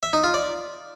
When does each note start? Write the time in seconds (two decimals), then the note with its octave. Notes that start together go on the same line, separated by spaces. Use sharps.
0.03 E5
0.13 D#4
0.24 F4
0.34 D5